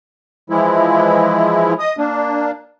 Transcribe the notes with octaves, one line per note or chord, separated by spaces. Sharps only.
E3 F3 G#3 E4
D#5 D#6
A#3 D4